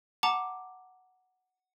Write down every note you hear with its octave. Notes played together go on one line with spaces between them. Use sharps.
F#5 A5 A#5 D6